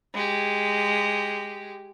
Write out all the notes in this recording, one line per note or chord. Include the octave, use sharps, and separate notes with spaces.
G#3 G4